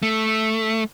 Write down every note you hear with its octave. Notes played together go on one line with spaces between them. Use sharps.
A3